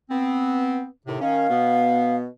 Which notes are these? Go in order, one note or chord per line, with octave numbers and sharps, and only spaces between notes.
B3 C4
D#2 A2 C3
D#3 C#4 F5
B2 B3